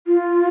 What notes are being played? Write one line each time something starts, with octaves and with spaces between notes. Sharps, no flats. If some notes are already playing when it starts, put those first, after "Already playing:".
F4